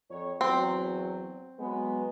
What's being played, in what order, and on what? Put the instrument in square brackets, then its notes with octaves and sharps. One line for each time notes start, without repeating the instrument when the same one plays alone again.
[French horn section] F2 C#5
[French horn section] E2 F#3 [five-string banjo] C4
[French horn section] F#3 G#3 B3